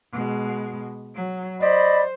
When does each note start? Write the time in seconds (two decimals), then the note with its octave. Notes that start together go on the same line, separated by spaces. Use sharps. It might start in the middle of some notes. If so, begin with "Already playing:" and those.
0.12 B2 G#3
1.15 F#3
1.60 C5 D5 D#5 B5